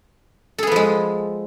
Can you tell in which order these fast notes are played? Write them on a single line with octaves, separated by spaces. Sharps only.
A4 G#4 B3 F3 G#3